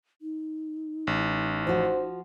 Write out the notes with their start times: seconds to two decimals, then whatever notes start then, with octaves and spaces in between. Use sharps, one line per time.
0.22 D#4
1.07 A1
1.67 F3 F#4 C5